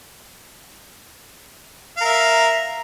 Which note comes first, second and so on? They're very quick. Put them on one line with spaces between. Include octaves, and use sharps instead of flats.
F5 A#4 E5